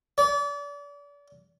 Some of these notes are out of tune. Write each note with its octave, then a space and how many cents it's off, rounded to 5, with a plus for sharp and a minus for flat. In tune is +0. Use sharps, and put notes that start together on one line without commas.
D5 -35